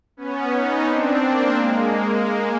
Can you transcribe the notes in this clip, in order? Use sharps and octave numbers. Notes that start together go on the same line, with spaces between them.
B3 C#4
C#4 D#4
C4 D4
A#3 C4
G#3 A#3